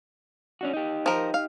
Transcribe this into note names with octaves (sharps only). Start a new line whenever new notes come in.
C#4 D4 F#4
D#4 G4
F3 A#4
F5